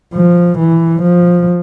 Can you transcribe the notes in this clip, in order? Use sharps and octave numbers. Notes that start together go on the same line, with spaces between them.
F3
E3
F3